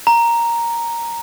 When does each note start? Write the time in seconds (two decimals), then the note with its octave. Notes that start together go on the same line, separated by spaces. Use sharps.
0.07 A#5